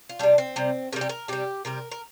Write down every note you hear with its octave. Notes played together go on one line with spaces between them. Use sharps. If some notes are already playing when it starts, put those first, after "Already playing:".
F4
C3 G3 D4
C4
C3 G3
C3 G3 A#4
G4
A#4
C3 G3 G4
C3 G3 A#4
A#4